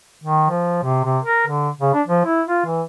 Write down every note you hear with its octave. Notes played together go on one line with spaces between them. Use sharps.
D#3
F3
C3
C3
A#4
D3
C#3
D4
F3
E4
F4
E3